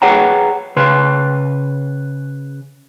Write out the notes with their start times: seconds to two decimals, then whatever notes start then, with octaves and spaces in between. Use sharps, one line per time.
0.02 G#4 B4 C#5 F#5 G5 A#5
0.76 C#3 B4 C6